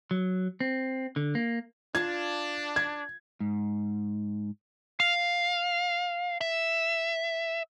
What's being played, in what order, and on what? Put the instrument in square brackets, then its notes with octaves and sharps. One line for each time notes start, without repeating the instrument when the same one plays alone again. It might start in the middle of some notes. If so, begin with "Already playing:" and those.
[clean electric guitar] F#3
C4
D3
A#3
[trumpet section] D4 [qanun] F4 F5 A5 [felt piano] G#6
[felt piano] G#6
[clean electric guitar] G#2
[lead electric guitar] F5
E5